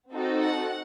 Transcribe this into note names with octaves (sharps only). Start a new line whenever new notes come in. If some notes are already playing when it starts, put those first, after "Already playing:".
C4 D#4 F#4 A4
F#5